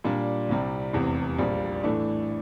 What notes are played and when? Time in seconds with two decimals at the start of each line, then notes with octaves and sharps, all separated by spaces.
0.04 A#2 G3 D4
0.49 C2 C3 G3
0.93 F1 E2 C3
1.39 A#1 A#2 G3
1.83 A2 E3 A3 D4